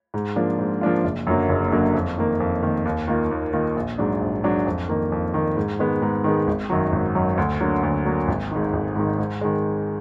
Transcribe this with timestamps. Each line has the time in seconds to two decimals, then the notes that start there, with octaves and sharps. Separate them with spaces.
0.14 G#2
0.36 F3 A#3 D4 F4
0.59 G#2
0.81 F3 A#3 D4 F4
1.04 F#1
1.27 F#2 D3 F#3 A#3
1.49 F#1
1.72 F#2 D3 F#3 A#3
1.95 F2
2.18 D#3 A#3
2.40 F2
2.63 D#3 A#3
2.85 D#2
3.08 D#3 A#3 F4
3.31 D#2
3.53 D#3 A#3 F4
3.76 A#1
3.98 G#2 F#3 D4
4.21 A#1
4.44 G#2 F#3 D4
4.67 F2
4.89 D#3 A#3
5.12 F2
5.34 D#3 A#3
5.57 G#2
5.79 D#3 G#3 B3
6.02 G#2
6.24 D#3 G#3 B3
6.47 G#1
6.70 F#2 D#3 F#3
6.92 G#1
7.15 F#2 D#3 F#3
7.38 D2
7.60 D3 F#3 A#3
7.83 D2
8.05 D3 F#3 A#3
8.28 G#1
8.51 G#2 D#3
8.73 G#1
8.96 G#2 D#3
9.19 G#2
9.41 D#3 G#3